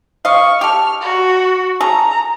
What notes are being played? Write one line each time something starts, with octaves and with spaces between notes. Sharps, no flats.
D#5 F5 C#6
G4 A4 F6
F#4
G#4 A4 A#5